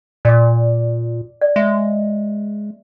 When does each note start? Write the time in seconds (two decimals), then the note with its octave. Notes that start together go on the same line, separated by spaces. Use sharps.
0.25 A#2 D5 D6
1.41 D5
1.56 G#3 E5